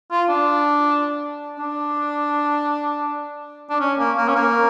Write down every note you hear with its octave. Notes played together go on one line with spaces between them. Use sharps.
F4
D4
D4
D4
C#4
A#3
A#3
C#4
A#3